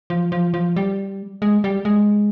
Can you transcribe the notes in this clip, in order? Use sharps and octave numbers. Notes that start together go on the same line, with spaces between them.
F3
F3
F3
G3
G#3
G3
G#3